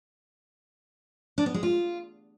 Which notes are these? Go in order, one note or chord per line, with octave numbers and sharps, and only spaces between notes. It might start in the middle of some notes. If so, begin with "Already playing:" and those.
D4
B3
G#3
F4